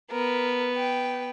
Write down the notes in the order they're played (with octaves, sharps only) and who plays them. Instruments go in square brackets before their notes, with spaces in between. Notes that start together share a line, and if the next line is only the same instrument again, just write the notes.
[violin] B3 [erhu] A#4
[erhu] G5